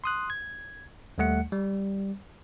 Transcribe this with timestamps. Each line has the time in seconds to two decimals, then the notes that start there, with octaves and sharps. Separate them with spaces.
0.04 C6 D#6 F#6
0.30 G#6
1.18 D#2 G3 A3 F#5 C#7
1.52 G3